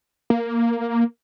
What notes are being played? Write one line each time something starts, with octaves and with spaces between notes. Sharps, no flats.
A#3